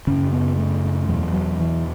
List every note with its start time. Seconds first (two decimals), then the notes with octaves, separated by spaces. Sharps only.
0.07 F#2 C#3 C#4
0.32 B3
0.58 A3
1.08 E2 B2 F#3
1.34 F#3
1.59 E3